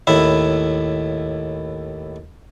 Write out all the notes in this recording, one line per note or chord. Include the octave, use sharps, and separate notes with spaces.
D#2 A2 E4 E5